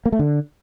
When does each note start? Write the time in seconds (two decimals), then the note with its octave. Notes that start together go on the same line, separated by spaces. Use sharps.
0.06 A#3
0.12 A3
0.19 D3